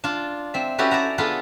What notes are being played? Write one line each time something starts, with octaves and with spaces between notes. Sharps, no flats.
D4 F4
C4 E5
C#4 E4 F#4 G4 A4 B4
D5 E5 F#5 A#5
B3 D4 F4 G#4 A4 B4